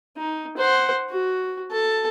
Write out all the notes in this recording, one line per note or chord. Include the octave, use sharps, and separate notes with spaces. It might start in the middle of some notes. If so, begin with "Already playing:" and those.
D#4
C5 F#5
F#4
A4 A5